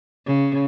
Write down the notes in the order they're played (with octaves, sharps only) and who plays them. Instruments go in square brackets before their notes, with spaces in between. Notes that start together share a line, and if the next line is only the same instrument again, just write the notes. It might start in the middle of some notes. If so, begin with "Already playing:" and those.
[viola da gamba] C#3